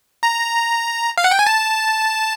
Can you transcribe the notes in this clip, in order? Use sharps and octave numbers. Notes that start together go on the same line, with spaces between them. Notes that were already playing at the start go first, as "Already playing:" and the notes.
A#5
F5
F#5
G5
G#5
A5